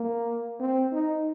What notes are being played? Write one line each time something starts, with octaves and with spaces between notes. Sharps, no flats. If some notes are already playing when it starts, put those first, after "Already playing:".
Already playing: A#3
C4
D#4